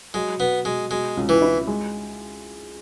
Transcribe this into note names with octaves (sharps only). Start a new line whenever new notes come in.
F#3 G#3
B2 B3
B2 G#3
B2 G#3
C#2
E3
E4
G#3